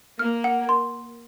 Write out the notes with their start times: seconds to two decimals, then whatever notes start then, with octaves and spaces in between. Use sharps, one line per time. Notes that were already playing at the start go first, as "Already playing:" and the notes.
0.19 A#3 F6
0.44 F#5
0.69 C6